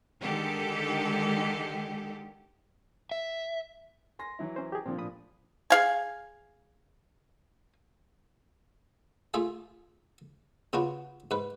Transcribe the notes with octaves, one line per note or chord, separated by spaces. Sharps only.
D3 D#3 G#3 G4 A4
E5
G#5 C6 A#6
E3 F#3 E4
C#4 C5
G4 G#4
A#2 F3 C4 D4
A2 B5 D#6
G#4 F5 G#5
A3 F4 G#4 E5 G#5
C#3 B3 D4 F4 F#4
G#2 B4